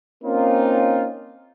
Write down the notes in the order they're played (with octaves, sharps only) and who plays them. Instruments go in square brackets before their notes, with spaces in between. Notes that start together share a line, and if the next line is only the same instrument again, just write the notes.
[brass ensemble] A#3 C4 C#4 D#4 F4